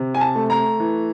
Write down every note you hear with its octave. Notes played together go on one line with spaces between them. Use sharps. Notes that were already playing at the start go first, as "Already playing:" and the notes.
Already playing: C3
G#5
A5
A3
A#5
E3